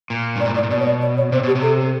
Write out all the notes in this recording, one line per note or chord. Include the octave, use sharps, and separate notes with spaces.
A#2
G2
D5
G#2
A2 D5
A#2
B2 D5
C#5
D5
D5
C#5
C3 C5
B2 G4
C3
A4